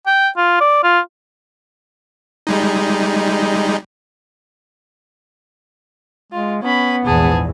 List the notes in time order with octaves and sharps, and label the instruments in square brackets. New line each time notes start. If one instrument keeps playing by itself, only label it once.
[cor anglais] G5
F4
D5
F4
[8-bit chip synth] G3 G#3 D#4
[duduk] G#3 [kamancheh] F4
[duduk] B3 [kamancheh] C#4 B5
[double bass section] A#1 E2 G#2 [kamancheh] G#4 A5